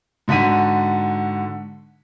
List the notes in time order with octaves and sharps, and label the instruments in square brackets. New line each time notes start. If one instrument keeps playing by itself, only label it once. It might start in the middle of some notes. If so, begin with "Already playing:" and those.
[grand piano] G#2 D3 F#4 B6 D#7